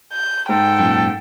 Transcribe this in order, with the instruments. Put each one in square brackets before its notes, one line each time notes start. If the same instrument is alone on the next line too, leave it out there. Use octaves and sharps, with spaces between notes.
[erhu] G6
[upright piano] G#2 [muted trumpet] A4 [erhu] G5
[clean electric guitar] F#2 A#2